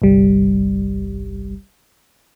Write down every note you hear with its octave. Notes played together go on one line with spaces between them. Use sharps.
G1 C2 G3